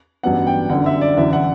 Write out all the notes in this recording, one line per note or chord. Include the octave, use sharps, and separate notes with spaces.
A1 G2 F#3 B3 D4 F#5
G5
G1 F#2 D3 F#5
E5
D5
G1 F#2 E3 E5
F#5